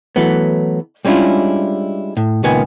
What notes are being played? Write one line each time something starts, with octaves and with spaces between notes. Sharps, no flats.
E3 F#3 A3 B3
G3 G#3 C#4 D4 E4 F4
A2
C#2 A#2 D#3 B3 G#5